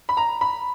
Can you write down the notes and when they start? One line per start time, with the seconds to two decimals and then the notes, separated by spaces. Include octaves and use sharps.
0.09 B5
0.17 A#5
0.41 B5